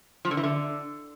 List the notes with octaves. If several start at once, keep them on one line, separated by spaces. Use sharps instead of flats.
F3
D3
E3
D3